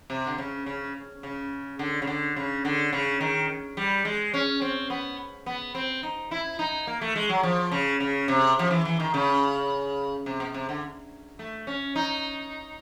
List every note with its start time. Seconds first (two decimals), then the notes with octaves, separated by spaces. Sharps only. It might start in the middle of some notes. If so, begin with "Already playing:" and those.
0.10 C3
0.26 D3
0.38 C#3
0.66 C#3
1.23 C#3
1.79 D3
2.02 C#3
2.07 D3
2.36 C#3
2.65 D3
2.93 C#3
3.21 D#3
3.77 G3
4.05 G#3
4.34 C#4
4.61 C4
4.90 B3
5.46 B3
5.75 C4
6.03 D#4
6.31 E4
6.59 D#4
6.87 A#3
7.01 A3
7.16 G#3
7.29 F#3
7.43 F3
7.71 C#3
8.00 C#3
8.28 C3
8.59 F3
8.71 E3
8.85 E3
9.00 D#3
9.14 C#3
10.26 C3
10.40 B2
10.54 C3
10.69 D3
11.39 A3
11.67 C#4
11.96 D#4